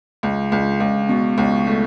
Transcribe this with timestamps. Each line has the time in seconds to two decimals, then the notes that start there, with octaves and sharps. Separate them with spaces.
0.23 C#2
0.52 C#2
0.80 C#2
1.09 B2
1.38 C#2
1.67 A3